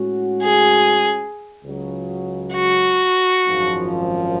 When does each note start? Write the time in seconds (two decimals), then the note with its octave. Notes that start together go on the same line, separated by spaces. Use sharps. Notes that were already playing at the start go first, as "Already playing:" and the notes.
Already playing: A2 G#3 C#4 F#4
0.43 G#4
1.64 C#2 C#3 F#3
2.55 F#4
3.47 G#1 F#2 F3